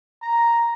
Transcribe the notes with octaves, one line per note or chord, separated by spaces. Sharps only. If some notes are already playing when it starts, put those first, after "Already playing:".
A#5